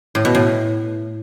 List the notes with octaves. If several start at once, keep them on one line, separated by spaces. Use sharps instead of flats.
A2
B2
A2